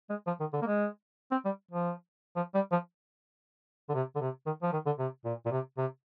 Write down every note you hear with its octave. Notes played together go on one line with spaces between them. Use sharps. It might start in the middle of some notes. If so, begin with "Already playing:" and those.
G#3
F3
D#3
D3
A#3
G#3
C4
G3
F3
F3
G3
F3
D3
C3
D3
C3
D#3
F3
D#3
D3
C3
A#2
A#2
C3
C3